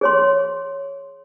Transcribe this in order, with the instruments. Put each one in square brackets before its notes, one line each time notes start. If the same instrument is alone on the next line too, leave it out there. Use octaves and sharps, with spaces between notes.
[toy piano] G#4 C#5 C6